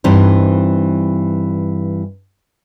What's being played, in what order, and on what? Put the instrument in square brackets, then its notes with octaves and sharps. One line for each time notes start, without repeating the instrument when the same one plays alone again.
[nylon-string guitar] G2 E3 C4 D#4